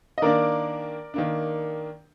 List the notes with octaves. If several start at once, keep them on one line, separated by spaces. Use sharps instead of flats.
D#5
D#3 A#3 D4 A#4 D5
D#3 A#3 D4